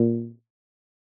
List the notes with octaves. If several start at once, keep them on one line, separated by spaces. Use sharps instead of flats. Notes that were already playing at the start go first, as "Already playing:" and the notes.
Already playing: A#2